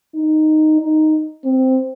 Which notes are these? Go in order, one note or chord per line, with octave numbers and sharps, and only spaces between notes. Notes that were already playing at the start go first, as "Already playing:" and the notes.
D#4
D#4
C4